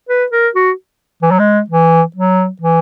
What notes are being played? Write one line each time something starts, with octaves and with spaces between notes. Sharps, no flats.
B4
A#4
F#4
E3
F#3
G#3
E3
F#3
E3